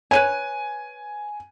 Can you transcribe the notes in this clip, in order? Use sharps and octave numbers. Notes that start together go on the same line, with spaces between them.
B4 C#5 G#5 D#7